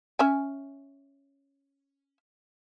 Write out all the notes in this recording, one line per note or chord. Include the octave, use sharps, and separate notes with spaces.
C#4 E5 G#5